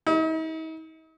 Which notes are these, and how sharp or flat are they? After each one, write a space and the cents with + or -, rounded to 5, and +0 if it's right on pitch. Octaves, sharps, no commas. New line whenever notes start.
D#4 +45